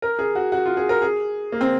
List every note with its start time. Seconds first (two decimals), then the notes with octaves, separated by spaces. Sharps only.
0.02 A#4
0.19 G#4
0.35 F#4
0.52 F#4
0.66 F4
0.77 G#4
0.89 A#4
1.02 G#4
1.52 A#3
1.61 C4